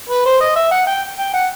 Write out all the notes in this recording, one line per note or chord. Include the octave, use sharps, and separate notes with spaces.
B4
C5
D#5
E5
F#5
G5
G5
F#5